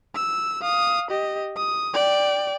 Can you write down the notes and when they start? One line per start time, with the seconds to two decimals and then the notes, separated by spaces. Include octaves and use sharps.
0.15 E6
0.61 F5 D#6
1.10 G4 D#5
1.56 D#6
1.94 D5 G5